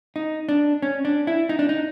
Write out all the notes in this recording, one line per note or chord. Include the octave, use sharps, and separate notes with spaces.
D#4
D4
C#4
D4
E4
D#4
D4
D#4